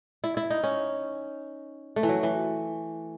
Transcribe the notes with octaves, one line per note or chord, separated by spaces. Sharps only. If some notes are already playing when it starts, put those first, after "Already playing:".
E4
E4
D#4
C#4
A3
E3
F#3
E3